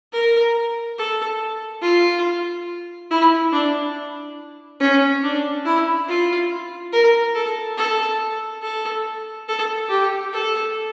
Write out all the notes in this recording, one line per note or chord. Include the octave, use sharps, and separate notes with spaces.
A#4
A4
F4
E4
D4
C#4
D4
E4
F4
A#4
A4
A4
A4
A4
G4
A4